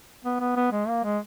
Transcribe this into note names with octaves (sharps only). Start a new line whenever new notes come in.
B3
B3
B3
G#3
A#3
G#3